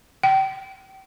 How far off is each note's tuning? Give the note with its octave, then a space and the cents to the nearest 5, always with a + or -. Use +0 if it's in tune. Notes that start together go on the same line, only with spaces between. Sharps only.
G5 -30